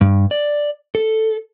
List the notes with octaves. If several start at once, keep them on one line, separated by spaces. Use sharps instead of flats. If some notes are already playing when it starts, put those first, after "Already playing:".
G2
D5
A4